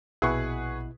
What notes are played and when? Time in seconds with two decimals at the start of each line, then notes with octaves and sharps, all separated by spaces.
0.22 A#1 B2 E4 G#4 B4 F#5 C#6